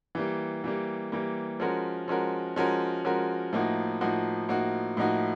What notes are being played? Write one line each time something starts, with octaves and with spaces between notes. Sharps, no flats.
E3 G3 A#3
E3 G3 A#3
E3 G3 A#3
F3 G#3 C#4 F#4 A#4
F3 G#3 C#4 F#4 A#4
F3 G#3 C#4 F#4 A#4
F3 G#3 C#4 F#4 A#4
A2 F3 A#3 D#4 F#4
A2 F3 A#3 D#4 F#4
A2 F3 A#3 D#4 F#4
A2 F3 A#3 D#4 F#4